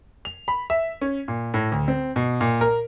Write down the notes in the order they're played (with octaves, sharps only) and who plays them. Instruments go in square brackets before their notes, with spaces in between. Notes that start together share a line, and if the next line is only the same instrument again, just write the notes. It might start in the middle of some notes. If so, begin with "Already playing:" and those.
[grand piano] F7
B5
E5
C#4
A#2
A2
D2
C4
B2
A#2
A#4